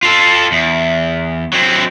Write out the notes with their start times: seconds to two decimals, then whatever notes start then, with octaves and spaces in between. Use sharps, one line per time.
0.03 F4 A4
0.52 E2
1.53 F#3 C4